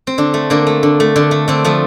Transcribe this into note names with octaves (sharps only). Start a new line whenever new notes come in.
C4
D3 D4
A3
D3 A#3
A3
D3
A3
D3
A3
D3 C4
F3 A3